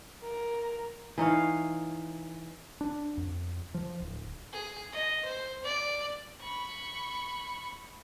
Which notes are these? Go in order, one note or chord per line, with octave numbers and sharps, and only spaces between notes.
A#4
E3 D#4 C#5 F5
D4
F2
F3
D1
G#4
D#5
C5
D5
B5 C#6